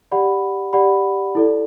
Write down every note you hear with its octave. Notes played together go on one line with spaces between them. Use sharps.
G4 D5 F#5 B5
G4 D5 F#5 B5
E4 A4 D5